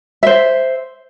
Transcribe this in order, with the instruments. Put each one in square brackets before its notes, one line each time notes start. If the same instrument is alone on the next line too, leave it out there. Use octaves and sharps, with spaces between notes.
[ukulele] C5 E5